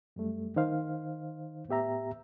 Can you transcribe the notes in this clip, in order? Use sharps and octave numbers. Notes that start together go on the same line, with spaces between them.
F#2 G3 A3
D#3 D#4 C5 F5
A2 B3 G4 E5 A#5